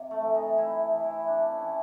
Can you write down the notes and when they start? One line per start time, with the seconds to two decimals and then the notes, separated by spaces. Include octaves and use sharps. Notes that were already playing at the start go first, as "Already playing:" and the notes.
Already playing: C3
0.11 A3
0.23 E3
0.35 D#4
0.58 C3 E4
0.92 E3
1.04 E4
1.27 C3 D4
1.51 C#4
1.62 E3